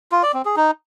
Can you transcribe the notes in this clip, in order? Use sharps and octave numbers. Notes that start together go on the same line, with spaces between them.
F4
D5
C4
G#4
D#4